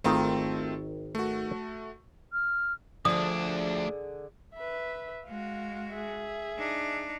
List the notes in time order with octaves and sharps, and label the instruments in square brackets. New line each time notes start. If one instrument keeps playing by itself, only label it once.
[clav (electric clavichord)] G#1 D#3 G5 [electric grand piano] A3 C4 F4
[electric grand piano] A3 F#4
[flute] F6
[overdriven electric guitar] D2 D4 [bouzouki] D3 G#4 [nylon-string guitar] F3 [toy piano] D#6
[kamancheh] B4 E5
[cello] G#3 F#4 [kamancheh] F5
[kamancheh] G#4 E5
[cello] D4 D#4